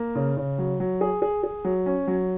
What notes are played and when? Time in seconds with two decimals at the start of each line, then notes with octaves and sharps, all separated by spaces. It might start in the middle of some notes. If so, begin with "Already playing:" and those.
Already playing: A#3
0.15 C#3
0.37 C#3
0.58 F#3
0.80 F#3
1.01 G#4
1.22 G#4
1.43 G#4
1.65 F#3
1.86 C#4
2.07 F#3